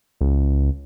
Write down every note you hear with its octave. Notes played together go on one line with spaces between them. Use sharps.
C#2